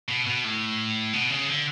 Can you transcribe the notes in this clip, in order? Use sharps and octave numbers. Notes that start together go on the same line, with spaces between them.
B2
B2
A2
B2
C#3
D3